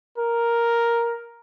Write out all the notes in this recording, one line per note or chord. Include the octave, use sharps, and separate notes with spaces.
A#4